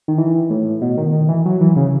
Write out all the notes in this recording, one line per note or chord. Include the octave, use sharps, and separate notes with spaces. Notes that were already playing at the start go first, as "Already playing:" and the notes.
D#3
E3
A2
B2
D#3
D#3
E3
F#3
E3
C#3